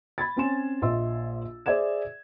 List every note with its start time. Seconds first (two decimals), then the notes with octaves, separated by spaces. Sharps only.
0.18 B5 G#6 A6
0.36 C4 C#4 C#5 G#5 C6 E7
0.82 A#1 F4 D#5 E5 C6 E6
1.66 G#4 C5 D5 E5 G#6 E7